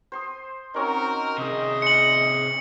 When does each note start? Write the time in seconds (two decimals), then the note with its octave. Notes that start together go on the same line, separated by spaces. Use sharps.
0.12 C5 C6 D#6
0.74 C4 C#4 D#4 F#4 A#4
1.38 C3 G#4 D#5
1.82 G#3 C#7 F#7